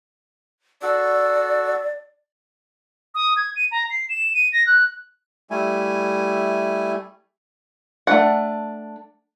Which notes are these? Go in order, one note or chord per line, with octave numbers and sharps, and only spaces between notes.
F#4 A4 D5
D#6
G#6
D#7
A#5
C7
E7
D#7
A#6
F#6
G3 A3 E4 G#5
A3 D4 F#5